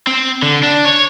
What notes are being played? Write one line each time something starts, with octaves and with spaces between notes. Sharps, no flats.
C4
D3
D4
C#5